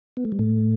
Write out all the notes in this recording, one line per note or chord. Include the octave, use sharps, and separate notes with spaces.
B3
A3
G3
A2 A3